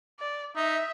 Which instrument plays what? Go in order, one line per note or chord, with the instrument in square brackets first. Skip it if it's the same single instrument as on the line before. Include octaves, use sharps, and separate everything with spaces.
[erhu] D5
[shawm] D#4 [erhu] E5